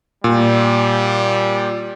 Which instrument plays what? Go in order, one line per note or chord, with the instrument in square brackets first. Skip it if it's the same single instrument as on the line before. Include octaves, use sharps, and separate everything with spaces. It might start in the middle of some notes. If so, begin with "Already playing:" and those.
[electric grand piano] A#2 [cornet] G3